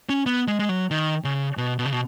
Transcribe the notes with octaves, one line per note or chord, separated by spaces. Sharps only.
C#4
B3
G#3
G#3
F#3
D#3
C#3
B2
B2
C#3
B2